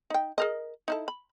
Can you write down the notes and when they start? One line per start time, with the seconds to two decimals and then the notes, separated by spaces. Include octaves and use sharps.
0.10 D#4 G5
0.38 G#4 A#4 D#5
0.88 D#4 E4 A4
1.08 B5